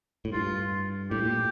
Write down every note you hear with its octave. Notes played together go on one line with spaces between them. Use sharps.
A2
G2 F4
A2 G4
A#2